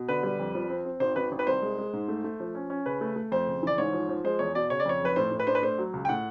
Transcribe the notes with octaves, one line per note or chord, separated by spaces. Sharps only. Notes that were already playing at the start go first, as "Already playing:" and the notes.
Already playing: B2
D3 B4
G3
F2
F3
C4
C4
G#1 C5
G#1 B4
G#1
B4
C2 C5
G#3
G#3
G#2
A3
A3
F3
C#4
C#4
C#3 B4
A3
A3
F2 C5
C#3
E3 D5
G#2 C#5
F3
F3
G#3 C5
E2 C#5
B2 D5
C#3 C#5
D5
F2 C#5
F1 B4
A2 C5
A2
B4
D4 C5
B4
A3 C5
F#3
C#2
G5
A2 F#5